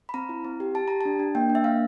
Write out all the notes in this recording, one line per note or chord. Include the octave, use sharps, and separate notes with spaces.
B5
C4 A#5
E4
C4
G4
G4 A5
G4 A#5
D4 A5
D4
A#3 G5
D4
E5
A#3 F5